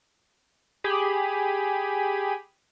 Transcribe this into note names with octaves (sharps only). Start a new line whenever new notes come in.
G4 G#4 B5 D#7